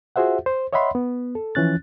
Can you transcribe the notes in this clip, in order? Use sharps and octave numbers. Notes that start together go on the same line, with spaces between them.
F4 F#4 G#4 C5 E5 F#5
C5
C#5 D#5 E5 F#5 B5 C6
B3
A4
E3 F3 C#4 F#6 A6